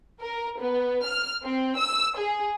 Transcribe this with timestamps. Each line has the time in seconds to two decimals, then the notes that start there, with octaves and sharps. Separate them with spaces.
0.21 A#4
0.60 B3
1.04 F6
1.44 C4
1.77 E6
2.17 G#4